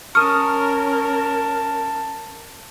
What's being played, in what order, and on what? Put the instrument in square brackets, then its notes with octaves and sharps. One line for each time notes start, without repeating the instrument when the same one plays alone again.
[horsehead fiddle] C#4 A#4 [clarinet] A5 [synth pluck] C#6 D#6 [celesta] F6